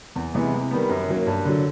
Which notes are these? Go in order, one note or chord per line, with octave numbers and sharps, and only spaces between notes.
E2
C3 E3 G#3 B3
C3
D#3 G3 B3
F#2
D#3 F#3 A#3
G2
D3 F#3